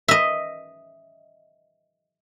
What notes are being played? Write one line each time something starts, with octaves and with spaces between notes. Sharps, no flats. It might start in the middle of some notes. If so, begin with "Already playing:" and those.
D#5 E5